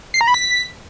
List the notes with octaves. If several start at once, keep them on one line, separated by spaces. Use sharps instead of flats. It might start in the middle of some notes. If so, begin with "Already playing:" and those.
C7
A#5
B5
B6